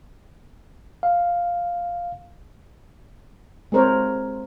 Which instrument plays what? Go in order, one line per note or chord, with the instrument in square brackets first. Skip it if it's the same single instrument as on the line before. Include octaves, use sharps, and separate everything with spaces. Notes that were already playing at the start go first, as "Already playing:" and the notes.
[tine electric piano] F5
[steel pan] G#3 C4 A#4 C5 C#5